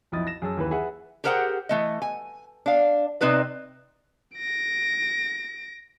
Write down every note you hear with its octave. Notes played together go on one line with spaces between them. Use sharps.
B1 F2 E4 D#5 D#6 A6
A#6 E7
F#2 G#4 A5 E6
D#2 E3 B4
G#4 B4 E5 F#5
G4 G#4 A#4 C5 F#5 G5
E3 A3 D#5
G#5
D4 F5
C3 C4 D#4 B4 D5
A#6 D7